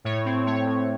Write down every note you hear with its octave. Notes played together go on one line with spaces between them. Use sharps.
A2 C#5
C4
A3 C#5
A2